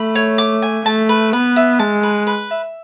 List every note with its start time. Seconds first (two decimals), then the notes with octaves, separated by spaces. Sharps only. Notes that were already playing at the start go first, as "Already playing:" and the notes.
Already playing: A3 B5
0.15 C#5
0.38 D6
0.62 G#5
0.85 A3 A5
1.09 B4
1.33 B3 B4
1.56 E5
1.79 G#3 A5
2.03 B4
2.27 B4
2.51 E5